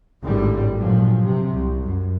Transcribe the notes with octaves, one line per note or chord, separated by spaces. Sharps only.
G#1 A2 D3 G3
G2 A#2 F3 F#3
C3
C2
F#2